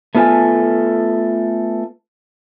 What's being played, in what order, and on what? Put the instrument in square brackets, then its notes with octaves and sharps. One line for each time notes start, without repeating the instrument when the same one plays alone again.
[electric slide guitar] A3 B3 F4 A4 G#5